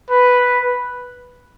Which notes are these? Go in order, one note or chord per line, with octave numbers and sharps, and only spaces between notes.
B4